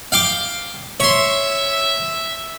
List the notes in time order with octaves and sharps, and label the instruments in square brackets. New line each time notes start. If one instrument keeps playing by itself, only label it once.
[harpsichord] F5 G5 D6
[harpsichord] C#5 C6 [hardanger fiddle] E5